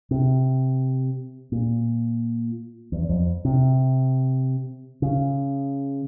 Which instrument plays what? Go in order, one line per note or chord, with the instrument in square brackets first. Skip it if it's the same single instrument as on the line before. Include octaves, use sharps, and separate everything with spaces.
[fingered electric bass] C3
A#2
E2
F2
C3
C#3